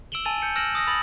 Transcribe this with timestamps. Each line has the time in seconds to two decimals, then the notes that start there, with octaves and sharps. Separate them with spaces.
0.12 E6 D7 E7 F#7 G7
0.25 G#5 A5 E6 A6 D#7 F7
0.42 G6 C#7
0.56 E6 F6 A#6 D7 E7 F#7
0.75 D#6 E6 A#6
0.87 B5 D#6 A6 A#6 F#7